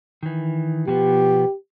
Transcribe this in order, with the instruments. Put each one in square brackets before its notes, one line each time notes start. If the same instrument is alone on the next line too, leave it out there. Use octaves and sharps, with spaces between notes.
[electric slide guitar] D#3 E3
[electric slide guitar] B2 F3 B3 [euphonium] G4